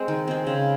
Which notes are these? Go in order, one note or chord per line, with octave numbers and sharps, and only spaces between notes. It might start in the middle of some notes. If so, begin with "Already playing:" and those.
Already playing: G#3 C4
D#3
G#3 C4
C#3